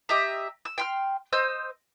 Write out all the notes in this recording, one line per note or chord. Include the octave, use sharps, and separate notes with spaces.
G4 D#5 E5 A#5
E6
G5 C6 F6
C5 D#5 E6 G6